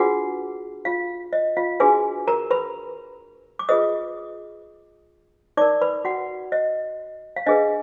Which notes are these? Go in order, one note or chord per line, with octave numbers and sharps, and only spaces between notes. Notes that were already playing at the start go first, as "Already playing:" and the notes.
Already playing: D4 F4 F#4 G#4 B4 F#5
F4 F5
D#5
F4 F5
D4 F#4 G#4 B4 G#5
A#4 A#5
B4 B5
D6
F4 G#4 B4 D#5 D#6
D#4 A#4 D5 D6
B4 B5
F#4 F#5
D#5
F5
D4 G#4 B4 D#5